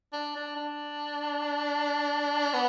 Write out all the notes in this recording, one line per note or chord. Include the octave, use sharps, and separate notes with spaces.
D4
D4
D4
B3